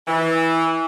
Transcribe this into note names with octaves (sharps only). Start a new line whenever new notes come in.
E3